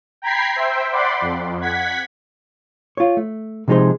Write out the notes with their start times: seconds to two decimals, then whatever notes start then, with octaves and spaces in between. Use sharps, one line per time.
0.22 G5 A#5 B5 G#6 B6 C7
0.56 C5 E5 G5
0.92 D5 F#5 B5 C6 D6
1.21 F2
1.61 F#5 G#6 B6
2.97 F4 C#5
3.17 A3
3.68 C3 F3 G#3 D#4 G#4 C5